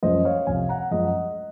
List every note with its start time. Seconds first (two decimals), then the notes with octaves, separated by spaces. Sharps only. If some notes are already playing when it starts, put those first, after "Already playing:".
0.03 F#2 F3 G#3 C#4 C5 D#5
0.25 C#5 F5
0.47 F2 C3 F3 F5 G#5
0.69 F#5 A#5
0.91 F#2 F3 G#3 D#5 F#5